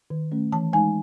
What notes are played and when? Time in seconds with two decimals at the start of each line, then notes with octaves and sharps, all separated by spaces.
0.10 D#3
0.32 A3 C#4
0.52 E3 A5
0.73 G#3 D#4 G#5